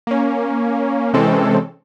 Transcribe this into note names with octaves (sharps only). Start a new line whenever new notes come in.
A#3 C#4
C3 E3 G#3 C4 C#4 A4